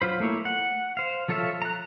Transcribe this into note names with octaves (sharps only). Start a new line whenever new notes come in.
F#3 F4 C5 B5
A3 A#3 E4 C#5
F#5
C5 F5
F3 F4 A4 C#5 E5
A#5 F#6